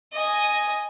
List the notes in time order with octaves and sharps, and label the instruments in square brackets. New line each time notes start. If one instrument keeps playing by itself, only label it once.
[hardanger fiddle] D#5 G#5